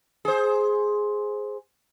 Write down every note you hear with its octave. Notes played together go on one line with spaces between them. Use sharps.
G#4 C5